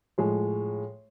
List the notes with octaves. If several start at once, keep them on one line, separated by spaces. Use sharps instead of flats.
A2 F3 G#3